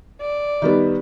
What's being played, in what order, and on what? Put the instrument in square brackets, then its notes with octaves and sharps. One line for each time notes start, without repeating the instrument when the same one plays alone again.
[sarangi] D5
[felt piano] D#3 G3 B3